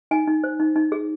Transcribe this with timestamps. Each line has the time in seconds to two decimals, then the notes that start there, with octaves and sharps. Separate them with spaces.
0.11 D#4 G#5
0.28 D#4
0.44 C5
0.60 D#4
0.76 D#4
0.92 G#4